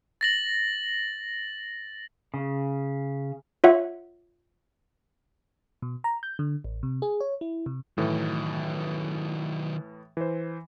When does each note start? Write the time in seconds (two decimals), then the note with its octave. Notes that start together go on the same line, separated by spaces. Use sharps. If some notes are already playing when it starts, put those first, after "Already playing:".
0.21 A6 A#6 F#7
2.34 C#3
3.64 F4 C#5 E5 F#5
5.82 B2
6.04 A#5
6.23 G6
6.39 D3
6.65 A1
6.83 C3
7.02 G#4
7.21 C#5
7.41 E4
7.66 C3
7.98 A2 D#3 E3 F#3
10.17 E3 C5